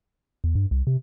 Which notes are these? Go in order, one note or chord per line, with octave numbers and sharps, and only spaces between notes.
E2
G2
C2
C3